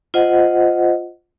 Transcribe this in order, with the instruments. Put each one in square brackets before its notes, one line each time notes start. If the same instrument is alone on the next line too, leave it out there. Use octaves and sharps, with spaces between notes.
[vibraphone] F4 C5 D#5 F#5